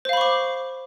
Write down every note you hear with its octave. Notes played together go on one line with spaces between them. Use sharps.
C5 F5 B5 C#6 D6